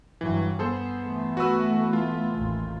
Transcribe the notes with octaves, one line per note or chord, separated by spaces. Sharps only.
G2 E3 F#3
B3 G#4 A4 C5
E3 A3
F#4 B4 E6
F4
A1 D#2